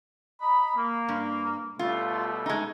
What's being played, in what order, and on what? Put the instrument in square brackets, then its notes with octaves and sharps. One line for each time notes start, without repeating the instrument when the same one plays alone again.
[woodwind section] D#5 A#5 B5
A#3
[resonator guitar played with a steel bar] G2
[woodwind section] B2 G3 A3 [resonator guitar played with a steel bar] F4
[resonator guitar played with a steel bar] G#3 D#4